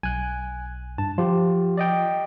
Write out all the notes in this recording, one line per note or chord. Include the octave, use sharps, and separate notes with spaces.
B1 G#5 F#6
G2 A5
F3 F4 G4
D5 D#5 G5